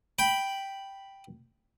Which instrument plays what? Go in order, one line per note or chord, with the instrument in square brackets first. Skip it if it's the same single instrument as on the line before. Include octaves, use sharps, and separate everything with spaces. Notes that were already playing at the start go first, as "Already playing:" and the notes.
[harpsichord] G5 B5